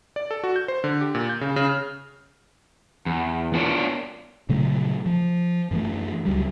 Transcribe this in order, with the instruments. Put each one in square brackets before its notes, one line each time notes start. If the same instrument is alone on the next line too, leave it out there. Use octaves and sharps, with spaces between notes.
[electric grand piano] D5
A4
F#4
G6
C5
D3
G4
A#2
G6
C#3
C#3
F6
[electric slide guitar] E2
B3 D4 F4 A#4 C#5 D5
[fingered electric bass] A#2 C#3 F#3 A3
F3
F#2 E3 A3
C#2 F#3 G3